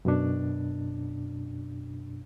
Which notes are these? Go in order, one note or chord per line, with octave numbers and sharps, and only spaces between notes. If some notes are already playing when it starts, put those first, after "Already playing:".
F#2 B2 D4